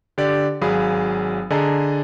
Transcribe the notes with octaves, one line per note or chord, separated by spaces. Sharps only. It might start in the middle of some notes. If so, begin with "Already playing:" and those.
D3 G4 D5
G#1 F#3 G#4 F5 B5
D3 G#4 D#5 A5 A#5